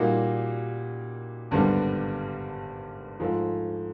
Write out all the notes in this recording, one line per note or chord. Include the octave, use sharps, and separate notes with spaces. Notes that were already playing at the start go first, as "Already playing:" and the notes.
Already playing: A#2 G3 A#3 D#4 F#4
G#1 G2 D3 G3 B3
G#2 F3 A3